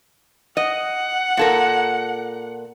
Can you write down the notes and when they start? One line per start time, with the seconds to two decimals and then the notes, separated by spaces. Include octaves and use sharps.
0.57 D#5 F#5
1.37 A#2 A4 A#4